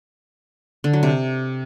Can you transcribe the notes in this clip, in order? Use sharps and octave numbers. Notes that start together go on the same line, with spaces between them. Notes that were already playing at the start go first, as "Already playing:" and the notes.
D3
F#3
C3